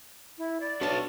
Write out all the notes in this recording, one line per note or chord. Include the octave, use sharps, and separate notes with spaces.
E4
D5
D4 F#4 B4 C#5 A5